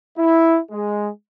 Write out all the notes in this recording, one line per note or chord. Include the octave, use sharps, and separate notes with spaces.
E4
G#3